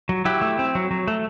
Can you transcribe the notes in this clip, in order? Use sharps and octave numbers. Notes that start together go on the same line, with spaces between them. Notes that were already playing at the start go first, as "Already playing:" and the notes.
F#3
F#3 E4 G4
A3
C4
F#3
F#3
A3